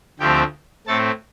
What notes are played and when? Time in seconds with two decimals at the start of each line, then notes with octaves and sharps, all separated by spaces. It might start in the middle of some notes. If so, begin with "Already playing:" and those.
0.20 D2 D3 F3 A3 C4 G4 G5
0.87 A2 A3 C4 A4 A5